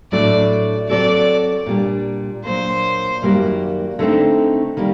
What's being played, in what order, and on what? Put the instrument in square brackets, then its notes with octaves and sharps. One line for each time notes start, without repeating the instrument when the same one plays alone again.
[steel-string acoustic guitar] A2 F#3 A3 D4 F#4 [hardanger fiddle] D5
[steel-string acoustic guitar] F#3 C4 F#4 A4 [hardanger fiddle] D5
[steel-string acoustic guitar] A#2 G3 D4
[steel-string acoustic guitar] A#2 F#3 A#3 D4 [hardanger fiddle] C5
[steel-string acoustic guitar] F#2 D#3 G3 A#3 F#4
D3 A3 C4 D#4
D#3 G3 A#3